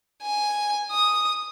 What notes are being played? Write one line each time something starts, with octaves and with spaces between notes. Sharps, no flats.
G#5
D#6